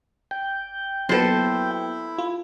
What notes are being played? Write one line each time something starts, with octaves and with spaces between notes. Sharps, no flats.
G5
F#3 A#3 B3 E4 A4 C5
F4